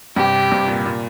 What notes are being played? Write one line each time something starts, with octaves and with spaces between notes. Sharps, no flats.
G2 C3 G4
G2 C3
A#2
A#2